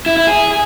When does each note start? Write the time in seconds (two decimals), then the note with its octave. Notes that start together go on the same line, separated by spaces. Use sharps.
0.06 E4
0.17 E4
0.27 G#4